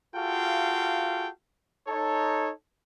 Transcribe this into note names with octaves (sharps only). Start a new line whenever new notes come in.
F4 F#4 G#4 A4 F5 G5
D#4 A4 C#5